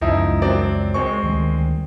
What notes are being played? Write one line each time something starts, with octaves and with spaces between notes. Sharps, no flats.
C#2 F#2 F3 G#3 D#4 E4
F#3 C4 D5
G#3 C4 C#6
D2 D#3 G3